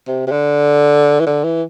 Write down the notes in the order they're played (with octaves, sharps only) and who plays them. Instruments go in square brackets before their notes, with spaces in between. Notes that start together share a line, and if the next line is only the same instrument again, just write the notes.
[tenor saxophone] C3
C3
D3
E3
D3
E3